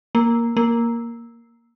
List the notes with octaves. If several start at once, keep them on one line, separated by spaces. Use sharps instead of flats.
A#3
A#3